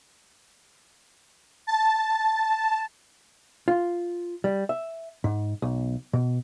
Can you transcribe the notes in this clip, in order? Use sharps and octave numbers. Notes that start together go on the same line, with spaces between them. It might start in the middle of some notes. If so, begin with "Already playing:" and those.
A5
F4
G3
E5
G#2
B1
B2